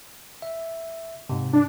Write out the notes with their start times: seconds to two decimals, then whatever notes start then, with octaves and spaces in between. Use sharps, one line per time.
0.42 E5
1.30 G#2 C3
1.53 D4